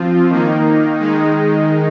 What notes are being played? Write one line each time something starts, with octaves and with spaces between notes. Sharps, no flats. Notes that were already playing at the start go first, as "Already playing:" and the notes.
Already playing: F3 C4 F4
D#3 A#3 D#4
D#3 G#3 D#4